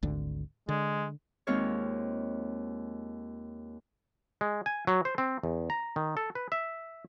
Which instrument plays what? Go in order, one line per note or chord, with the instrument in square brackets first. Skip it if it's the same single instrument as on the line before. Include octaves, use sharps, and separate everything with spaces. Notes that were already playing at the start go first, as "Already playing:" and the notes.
[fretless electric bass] G#1 D2 D3
[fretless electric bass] D3 [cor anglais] G#3
[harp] D#2 G#3 C4 F4 C#5 F6
[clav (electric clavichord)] G#3
G#5
F#3
C5
C4
E2
A#5
D#3
A4
B4
E5